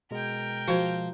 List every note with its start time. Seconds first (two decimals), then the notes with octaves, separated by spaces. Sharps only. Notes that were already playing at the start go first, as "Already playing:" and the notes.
0.11 B2 G#3 A#4 G5
0.68 F3 F#4 C5